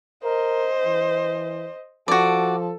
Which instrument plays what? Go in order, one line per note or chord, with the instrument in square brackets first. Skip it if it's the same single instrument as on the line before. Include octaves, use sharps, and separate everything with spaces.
[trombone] A#4 [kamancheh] C5 D#5
[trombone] E3
[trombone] F3 [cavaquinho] F#4 D5 [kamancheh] A4